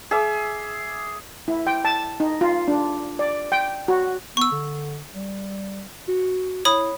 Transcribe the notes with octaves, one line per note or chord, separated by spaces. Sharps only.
G#4 E5 D6
E4
G5
A5
D#4
F4
D4
D5
G5
F#4
B3 C#6 E6
D3
G3
F#4
E4 C#5 B5 D#6